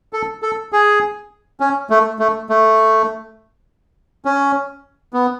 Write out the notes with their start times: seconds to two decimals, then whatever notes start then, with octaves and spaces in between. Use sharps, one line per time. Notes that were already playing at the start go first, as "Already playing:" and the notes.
0.13 A4
0.42 A4
0.73 G#4
1.60 C#4
1.90 A3
2.19 A3
2.49 A3
4.25 C#4
5.13 B3